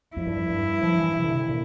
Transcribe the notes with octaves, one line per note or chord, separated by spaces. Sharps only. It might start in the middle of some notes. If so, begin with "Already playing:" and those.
F2 E4
G2
F2
G2
F3
E3
C3
D3
C3
A#2